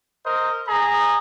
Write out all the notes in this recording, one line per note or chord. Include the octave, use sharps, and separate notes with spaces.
A#4 C5 D#5
G#4 A#5